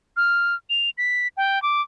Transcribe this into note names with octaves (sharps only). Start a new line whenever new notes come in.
F6
F7
B6
G5
D6